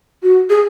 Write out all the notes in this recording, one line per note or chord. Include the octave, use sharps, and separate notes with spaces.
F#4
G#4